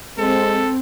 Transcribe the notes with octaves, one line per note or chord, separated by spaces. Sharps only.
G#3 C4 A4